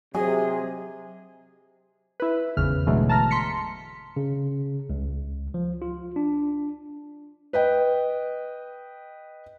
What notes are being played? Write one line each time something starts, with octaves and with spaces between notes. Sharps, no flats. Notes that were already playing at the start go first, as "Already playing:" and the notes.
C3 F#3 G#4 D#5 G#5
E4 B4
G#1 E2 C#3 F6
B2 D3 E3 F#3 G#3 A3
A5 A#5 F6 A#6
C6 B6 C#7
C#3
C#2
F3
F4
D4
B4 D#5 G5